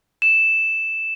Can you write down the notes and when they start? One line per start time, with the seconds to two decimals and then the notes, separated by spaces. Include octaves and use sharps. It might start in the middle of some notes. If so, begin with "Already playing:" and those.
0.22 E7